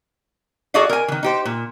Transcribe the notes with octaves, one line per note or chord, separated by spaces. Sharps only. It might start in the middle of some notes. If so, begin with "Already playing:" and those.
F#4 G#4 A4 D5 D#5 F5
A#4 G#5
D#3 E3
D#4 G4 C5
A#2